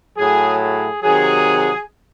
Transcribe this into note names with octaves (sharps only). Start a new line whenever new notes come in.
A2 F#3 G#4
G#4
C3 D#3 F#3 G#4